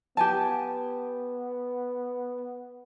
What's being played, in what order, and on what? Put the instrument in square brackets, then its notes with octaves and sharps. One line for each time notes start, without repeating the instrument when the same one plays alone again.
[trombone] B3 [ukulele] G4 G#5 A5